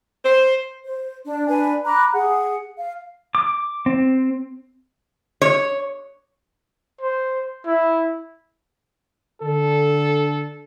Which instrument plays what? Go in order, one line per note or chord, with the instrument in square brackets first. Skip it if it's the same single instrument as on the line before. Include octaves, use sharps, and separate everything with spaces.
[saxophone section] C5
[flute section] C5
D4
D4 B4 G#5
A#5 B5 D6 F#6
G#4 F#5
F5
[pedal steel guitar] D6
C4
[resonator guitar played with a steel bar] C#5
[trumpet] C5
E4
[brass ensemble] D3 A4